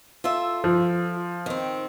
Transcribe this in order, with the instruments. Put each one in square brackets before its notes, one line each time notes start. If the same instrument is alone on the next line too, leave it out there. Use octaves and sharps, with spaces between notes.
[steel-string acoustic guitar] F4 A4 E5
[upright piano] F3
[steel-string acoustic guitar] D#3 C4